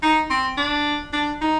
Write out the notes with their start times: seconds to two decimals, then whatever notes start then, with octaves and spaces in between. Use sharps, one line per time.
0.02 D#4
0.30 C4
0.57 D4
1.13 D4
1.41 D#4